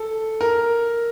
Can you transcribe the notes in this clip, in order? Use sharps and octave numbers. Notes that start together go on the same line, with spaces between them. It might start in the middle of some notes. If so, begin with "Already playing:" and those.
Already playing: A4
A#4